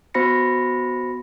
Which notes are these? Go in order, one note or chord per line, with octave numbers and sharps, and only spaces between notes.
B3 F#4 C5 B5 A#6 C#7